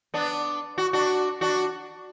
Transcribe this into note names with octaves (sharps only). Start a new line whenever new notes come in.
B3 D4
F#4
D4 F#4
D4 F#4